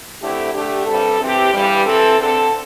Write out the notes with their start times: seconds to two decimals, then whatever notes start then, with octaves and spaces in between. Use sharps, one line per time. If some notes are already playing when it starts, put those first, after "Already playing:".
0.21 D3 A3 C4 E4 G4
0.53 D3 A3 D4 G4
0.86 G2 G3 C4 A4
1.20 E3 C4 G4
1.52 G2 E3 G3
1.85 E3 C4 A4
2.19 D3 C4 A4